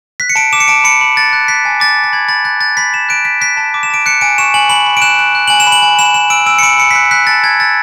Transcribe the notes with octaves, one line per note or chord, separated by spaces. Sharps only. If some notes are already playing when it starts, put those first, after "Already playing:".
F#6 B6
C#7
A5 D7
D6 E7
C#7
A5 D7
B5 C#7
B5
F#6 A6
F#6
F#6 B6
G#5
D6 A6
G#5
A6
B5 G#6
B5 A6
F#6 A6
F#6 A6
B5 B6
B5 E7
F#6 D7
F#6 B6
F#6 B6
A5
D6
E7
A5 D7
F#6 C#7
G#5 D7
C#6 E7
G#5 F#7
B5 F#7
B5
D7
F#6 E7
F#6
F#6
G#5 F#7
E7
B5
F#7
G#5
B5 E7
B5 E7
E6 D7
E6 D7
C#7
B5 D7
B5 C#7
B6
F#6 C#7
F#6 B6
A5 A6
A5 G#6
E6 A6